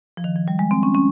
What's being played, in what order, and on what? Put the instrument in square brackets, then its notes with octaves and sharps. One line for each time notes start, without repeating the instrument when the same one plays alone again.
[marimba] F3
D#3
F3
G3
G#3
C4
C#4
C#4